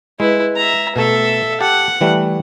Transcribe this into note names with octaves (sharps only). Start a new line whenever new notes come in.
G#3 E4 B4
E5 A#5
B2 A3 A4 E5
G4 F#5 A5
E3 G3 A3